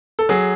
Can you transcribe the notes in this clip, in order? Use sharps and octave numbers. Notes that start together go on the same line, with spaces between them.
A4
F#3 G#4